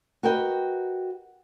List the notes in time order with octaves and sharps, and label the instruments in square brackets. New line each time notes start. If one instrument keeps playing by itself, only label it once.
[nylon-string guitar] F#4 G4 A#4 B4 D#5 G5